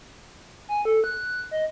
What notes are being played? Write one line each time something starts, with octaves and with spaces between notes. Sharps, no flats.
G#5
A4
F#6
D#5